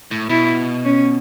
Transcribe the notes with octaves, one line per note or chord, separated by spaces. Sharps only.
A2
B2 E4
C#4